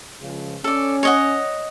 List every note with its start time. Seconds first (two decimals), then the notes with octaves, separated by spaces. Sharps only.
0.21 C#2 C#3 F3
0.64 C#4 A4 D5
1.03 C#5 D#5 F#5